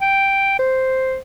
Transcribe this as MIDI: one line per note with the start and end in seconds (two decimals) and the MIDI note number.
0.02 0.58 79
0.59 1.17 72